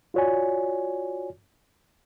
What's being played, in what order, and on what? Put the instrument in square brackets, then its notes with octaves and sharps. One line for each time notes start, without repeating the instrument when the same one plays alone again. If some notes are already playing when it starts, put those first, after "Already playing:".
[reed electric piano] F4 F#4 C#5 D5 G#5